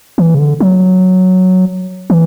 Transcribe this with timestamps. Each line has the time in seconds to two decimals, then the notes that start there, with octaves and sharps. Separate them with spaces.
0.18 E3
0.35 C#3
0.39 D3
0.60 F#3
2.10 E3